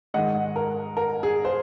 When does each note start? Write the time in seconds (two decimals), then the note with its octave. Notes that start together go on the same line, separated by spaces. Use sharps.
0.14 G#2 D#3 G#3 D#5 F#5
0.56 A#4
0.97 A#4
1.23 G#4
1.45 C5